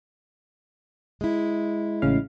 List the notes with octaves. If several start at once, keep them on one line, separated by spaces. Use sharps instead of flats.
G#3 E4
A1 C#3 F5